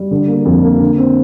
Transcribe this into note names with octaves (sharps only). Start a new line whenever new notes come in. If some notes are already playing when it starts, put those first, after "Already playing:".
Already playing: G3
D3
A#3
F2
A#3
D3
C4